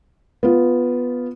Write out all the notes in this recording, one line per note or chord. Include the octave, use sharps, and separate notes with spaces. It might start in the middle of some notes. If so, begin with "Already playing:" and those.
B3 F4